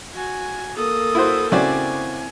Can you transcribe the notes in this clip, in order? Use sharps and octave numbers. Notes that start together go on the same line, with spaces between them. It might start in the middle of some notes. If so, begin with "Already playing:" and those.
F#4 G#5
A#3 A4 D#6
E4 F#4 C5
C#3 C4 E4 F#4 C5 D5 G#5